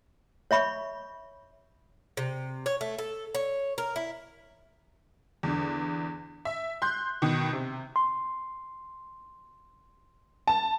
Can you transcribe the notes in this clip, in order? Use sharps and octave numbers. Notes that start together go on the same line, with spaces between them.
C#5 E5 B5 C#6
C3
C#5
A3
A4
C#5
A#4
E4
E2 D3
E5
C6 F#6 G6
B2 D#3
C3
C6
A5